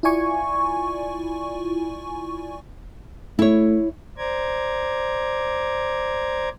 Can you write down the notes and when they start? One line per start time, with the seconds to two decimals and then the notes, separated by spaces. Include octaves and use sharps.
0.03 E4 F4 D5 G#5 C#6
3.39 A3 E4 C#5
4.18 C5 D5 A#5 D6 G#6